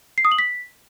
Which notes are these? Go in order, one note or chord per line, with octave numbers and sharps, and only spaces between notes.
C7
D#6
F#7
B6